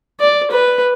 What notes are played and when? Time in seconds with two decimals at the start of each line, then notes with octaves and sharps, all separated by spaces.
0.20 D5
0.51 B4